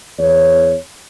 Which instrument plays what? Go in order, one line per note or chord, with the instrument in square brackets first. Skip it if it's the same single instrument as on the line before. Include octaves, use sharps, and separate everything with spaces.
[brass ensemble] E2 C#5